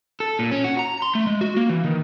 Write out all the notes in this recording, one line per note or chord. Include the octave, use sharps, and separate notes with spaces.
A4
A#2
C#4
F#4
A#5
C6
A3
G#3
F#4
A#3
E3
D#3